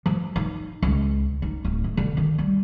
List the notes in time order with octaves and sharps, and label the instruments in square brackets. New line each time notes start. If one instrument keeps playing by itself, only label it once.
[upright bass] F3
D#4
C#2
D#4
D1
A3
D3
D#3
G3